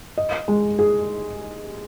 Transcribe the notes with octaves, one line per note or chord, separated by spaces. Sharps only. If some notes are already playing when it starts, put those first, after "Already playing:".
D#5
G#3
G#4